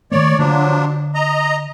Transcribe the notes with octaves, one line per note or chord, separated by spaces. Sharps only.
D#3 A3 A#3 C#5 D5
D3 F3 F#3 D4
D#5 A#5